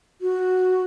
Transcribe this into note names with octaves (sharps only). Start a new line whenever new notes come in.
F#4